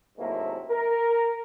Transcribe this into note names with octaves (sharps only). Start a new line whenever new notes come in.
G#2 C3 F#3 A3 A#3 E4
A#4